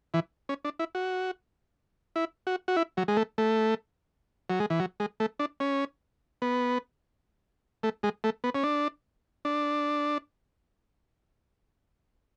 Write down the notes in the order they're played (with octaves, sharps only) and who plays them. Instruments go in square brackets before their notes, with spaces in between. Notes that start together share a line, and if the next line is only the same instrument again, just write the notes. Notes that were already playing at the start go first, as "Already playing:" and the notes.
[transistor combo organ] E3
C#4
D4
E4
F#4
E4
F#4
F#4
E4
F#3
G#3
A3
A3
F#3
G#3
E3
F#3
G#3
A3
D4
C#4
B3
A3
G#3
A3
B3
C#4
D4
D4